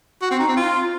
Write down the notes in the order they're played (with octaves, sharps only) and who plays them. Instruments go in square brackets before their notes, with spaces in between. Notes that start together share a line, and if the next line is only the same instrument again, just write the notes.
[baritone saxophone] F#4
C4
D#4
C4
F4